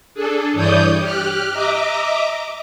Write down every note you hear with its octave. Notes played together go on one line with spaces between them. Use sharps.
D4 G#4 A4
G2 E3 C#5 D5 D#6 G6
G4 F6 F#6
D#5 E5 A#5 D6